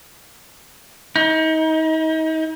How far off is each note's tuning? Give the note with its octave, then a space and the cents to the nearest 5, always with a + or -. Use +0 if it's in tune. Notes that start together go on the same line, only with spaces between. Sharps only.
D#4 +35